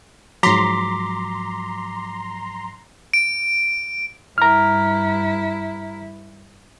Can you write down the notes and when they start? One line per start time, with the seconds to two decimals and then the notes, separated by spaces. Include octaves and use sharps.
0.43 G#2 F3 F#3 A#5 C6 D6 B6
3.14 D7
4.38 G2 E4 A#5 F6